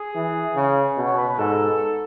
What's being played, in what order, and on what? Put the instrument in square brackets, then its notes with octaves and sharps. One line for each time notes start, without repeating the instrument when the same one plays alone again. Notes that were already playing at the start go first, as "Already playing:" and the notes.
Already playing: [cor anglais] G#4
[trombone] E3
C#3
B2
[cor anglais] C#5
B4
B4
[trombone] G#2 [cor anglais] A4